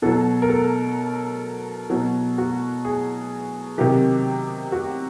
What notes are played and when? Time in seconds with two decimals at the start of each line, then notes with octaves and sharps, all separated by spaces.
0.02 B2 F#3 A4
0.42 A#4
0.50 A4
1.90 B2 F#3
2.38 F#4
2.85 G#4
3.78 C3 D#3 F#3 G4
4.72 F#4